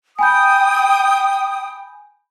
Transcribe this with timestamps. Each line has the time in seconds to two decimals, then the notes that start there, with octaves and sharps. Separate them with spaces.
0.19 G5 G#5 B5 D#6 G6